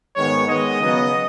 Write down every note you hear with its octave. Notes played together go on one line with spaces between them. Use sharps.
G#2 D#3 G#3 B3 C#5
D#3 G#3 B3 D#5
C#3 F#3 B3